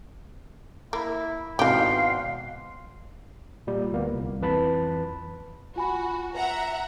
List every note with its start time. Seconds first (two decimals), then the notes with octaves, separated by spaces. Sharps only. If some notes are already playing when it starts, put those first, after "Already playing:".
0.93 A#3 E4
1.59 G#1 B2 E3 D#4 G4 F5 F#5 C6
3.67 A#2 G3
3.92 D2 A#3 B3
4.13 C2
4.41 F2 E3 B4 A5 B5
5.76 F4 F#4 G#5 B5
6.35 B4 E5 F#5 A#5